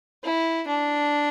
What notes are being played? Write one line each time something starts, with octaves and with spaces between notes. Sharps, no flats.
E4
D4